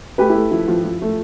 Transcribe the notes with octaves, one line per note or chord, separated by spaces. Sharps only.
A3 G4 B4
E4 G4
A3
F3 E4
F3
F3
A3